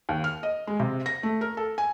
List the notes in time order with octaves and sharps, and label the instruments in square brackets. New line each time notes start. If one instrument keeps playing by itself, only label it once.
[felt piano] D#2
F6
D#5
G#3
C3
A#6
A3
A#4
A4
G#5